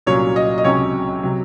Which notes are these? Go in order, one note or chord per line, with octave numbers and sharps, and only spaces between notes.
C2 A#2 F#3 C#4 C#5
D#5
D#5
C#2 C3 F#3 C#4 C#5
C3 F#3